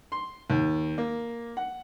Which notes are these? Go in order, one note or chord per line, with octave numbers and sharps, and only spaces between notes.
C6
D#2
A#3
F#5